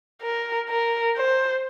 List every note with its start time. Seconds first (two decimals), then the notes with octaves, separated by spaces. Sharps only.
0.22 A#4
0.69 A#4
1.16 C5